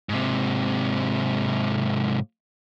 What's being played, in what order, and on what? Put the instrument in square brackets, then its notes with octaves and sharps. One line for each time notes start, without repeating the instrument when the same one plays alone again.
[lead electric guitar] G#2 C3